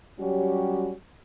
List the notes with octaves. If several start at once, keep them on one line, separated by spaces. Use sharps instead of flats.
F#3 G3 C#4 F#4 G4